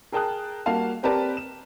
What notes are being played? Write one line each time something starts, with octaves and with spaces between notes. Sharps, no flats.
G#4 A#4 G5 A5 D#6 F#6
G3 A#3 F#4 F5 A5
C4 G4 A#4 B4 D5 A5
E7